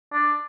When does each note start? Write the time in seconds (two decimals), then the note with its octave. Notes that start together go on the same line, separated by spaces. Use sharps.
0.13 D4